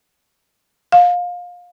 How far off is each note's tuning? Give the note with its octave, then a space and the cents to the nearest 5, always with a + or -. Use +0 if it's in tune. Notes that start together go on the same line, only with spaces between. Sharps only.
F5 +25